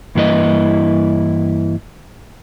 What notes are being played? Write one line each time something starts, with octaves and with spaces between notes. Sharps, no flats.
G2 E3 A#3 E4 B4 D#5